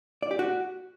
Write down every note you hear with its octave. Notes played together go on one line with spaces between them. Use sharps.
D5
G4
F#4